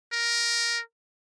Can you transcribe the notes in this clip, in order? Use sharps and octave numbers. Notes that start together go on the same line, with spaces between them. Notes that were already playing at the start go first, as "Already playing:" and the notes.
A#4